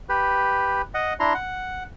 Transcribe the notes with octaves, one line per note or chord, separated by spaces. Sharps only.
G4 B4
D#5 F#5
D4 E4 A#5 C6
F#5